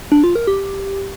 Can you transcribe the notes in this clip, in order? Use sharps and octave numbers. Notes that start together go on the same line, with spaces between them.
D4
F4
A#4
G4